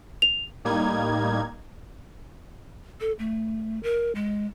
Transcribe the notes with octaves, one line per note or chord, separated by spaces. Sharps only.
F7
A2 G3 A#3 D#4 G#6
A4
A3
A#4
G#3